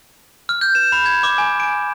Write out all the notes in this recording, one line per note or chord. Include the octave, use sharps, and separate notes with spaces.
F6
G6
E7
B5
G#6
D6
G#5
D7